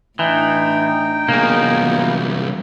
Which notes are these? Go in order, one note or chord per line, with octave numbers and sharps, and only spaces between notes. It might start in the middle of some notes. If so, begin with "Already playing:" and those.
A2 E3 D4 D#4 G5
C2 E3 F#3 A#3 B3 G#4